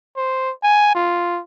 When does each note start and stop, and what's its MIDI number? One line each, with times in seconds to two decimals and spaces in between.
0.17 0.52 72
0.63 0.94 80
0.95 1.40 65